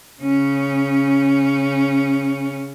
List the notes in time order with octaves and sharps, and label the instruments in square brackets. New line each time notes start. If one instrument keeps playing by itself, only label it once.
[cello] C#3 C#4